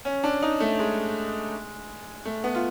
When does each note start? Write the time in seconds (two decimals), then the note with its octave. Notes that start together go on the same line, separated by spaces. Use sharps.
0.05 C#4
0.24 D4
0.42 D#4
0.60 A3
0.79 G#3
2.25 A3
2.44 B3
2.55 F4